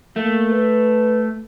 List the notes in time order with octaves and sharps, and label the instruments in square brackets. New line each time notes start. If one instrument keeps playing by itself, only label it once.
[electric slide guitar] A3 [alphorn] A#3
[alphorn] B4